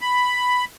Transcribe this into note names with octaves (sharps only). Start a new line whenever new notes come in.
B5